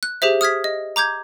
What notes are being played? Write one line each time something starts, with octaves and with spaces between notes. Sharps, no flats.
F#6
G4 G#4 C5 E5
D#6 F6 G#6 B6
D#5
A#5 D6 G6 G#6